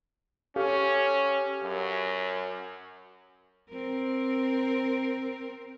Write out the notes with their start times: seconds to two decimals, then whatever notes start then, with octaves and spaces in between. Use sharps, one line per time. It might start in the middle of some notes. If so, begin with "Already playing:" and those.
0.56 C#4 G4 A4 F5
1.63 F#2
3.71 C4 A#4